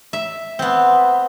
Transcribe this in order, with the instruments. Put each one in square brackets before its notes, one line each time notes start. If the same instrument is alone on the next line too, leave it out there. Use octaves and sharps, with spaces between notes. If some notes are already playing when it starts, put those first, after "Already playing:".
[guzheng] E5
B3 C4